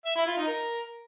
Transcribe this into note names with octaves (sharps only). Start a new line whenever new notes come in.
E5
E4
F4
D#4
A#4